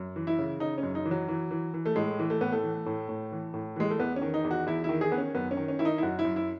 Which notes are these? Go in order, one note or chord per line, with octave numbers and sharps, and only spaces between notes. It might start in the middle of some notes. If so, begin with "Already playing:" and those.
Already playing: F#2
E3
E4
C#3
C#3 D#4
C#4
F#2
D#4
E3
F#3
E3
E3
E3
A3
A2 G#3
E3
A3
A2 B3
A3
E3
A2
A2
E3
A2
E3 G#3
A3
E2 B3
C#4
D#3
D#4
E2
F#4
E2 E4
E4
D#3
G#4
D#3 B3
C#4
F#2 B3
C#4
D#3
C#4
D#3 E4
D#4
E4
F#2 F#4
E4
F#2
E4